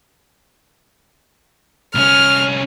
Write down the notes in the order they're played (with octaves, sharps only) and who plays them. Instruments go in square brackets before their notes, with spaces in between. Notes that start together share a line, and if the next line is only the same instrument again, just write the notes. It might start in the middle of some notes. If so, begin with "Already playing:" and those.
[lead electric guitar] C2 C#4 [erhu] F6